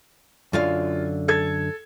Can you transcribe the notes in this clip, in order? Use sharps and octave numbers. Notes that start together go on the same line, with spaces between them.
F#2 D3 F4 F5
A4 G#6